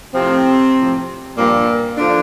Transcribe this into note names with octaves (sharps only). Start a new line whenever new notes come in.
A2 C3 F3 C4
A2 F3
G2 A#2 F3 A#3
D3 F3 D4